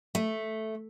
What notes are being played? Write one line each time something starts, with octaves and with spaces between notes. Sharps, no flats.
A3